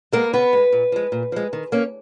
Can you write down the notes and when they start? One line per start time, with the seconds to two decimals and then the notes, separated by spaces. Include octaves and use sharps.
0.12 G#3 A#3 B3 A#4
0.33 C#3 B3 B4
0.53 G#3 B3
0.72 A#2
0.92 F3 G#3
1.12 A#2
1.32 F3 G#3
1.53 D#3
1.72 A#3 C#4